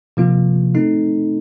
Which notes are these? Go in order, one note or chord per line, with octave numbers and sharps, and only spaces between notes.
C3 F3 A#3 F4
A3 C4 D#4 A4